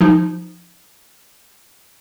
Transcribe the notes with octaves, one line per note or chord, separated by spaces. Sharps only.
F3 D#4